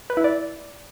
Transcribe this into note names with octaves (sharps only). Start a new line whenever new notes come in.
B4
E4
D5